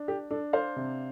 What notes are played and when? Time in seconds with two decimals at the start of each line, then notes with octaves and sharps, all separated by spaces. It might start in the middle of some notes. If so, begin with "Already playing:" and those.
Already playing: D4
0.08 G4
0.31 D4 A4
0.53 C5 F5
0.76 C3